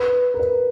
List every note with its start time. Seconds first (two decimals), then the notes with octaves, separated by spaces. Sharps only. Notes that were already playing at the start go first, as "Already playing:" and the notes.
Already playing: B4
0.34 A#4
0.40 B4